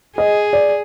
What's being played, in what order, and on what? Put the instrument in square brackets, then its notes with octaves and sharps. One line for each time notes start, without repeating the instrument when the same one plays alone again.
[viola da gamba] G#4 [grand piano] D#5
[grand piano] D5